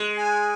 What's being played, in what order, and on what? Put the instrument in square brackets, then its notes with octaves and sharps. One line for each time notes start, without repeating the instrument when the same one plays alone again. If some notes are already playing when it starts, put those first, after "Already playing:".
Already playing: [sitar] G#3
[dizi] G#5